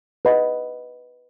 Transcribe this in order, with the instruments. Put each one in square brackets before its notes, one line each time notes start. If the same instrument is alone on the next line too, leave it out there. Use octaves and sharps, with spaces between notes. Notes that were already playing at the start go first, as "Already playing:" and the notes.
[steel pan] B4 D#5 F#5 B5